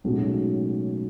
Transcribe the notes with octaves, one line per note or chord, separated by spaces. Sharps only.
B1 A2 G#3 C#4 F#4